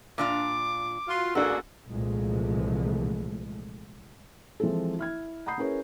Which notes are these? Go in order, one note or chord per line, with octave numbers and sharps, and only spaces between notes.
A#2 D4 F4 D6
F4 F#4
A1 A#3 D4 F#4 G#4 A4
C2 A#2 E3 F3 G#3 A3
E3 F3 G#3 C4 E4 A4
E4 F6 G#6
F#5 A#5 B5 D#6 G6 C7
C#4 E4 G#4 A#4 B4 C#5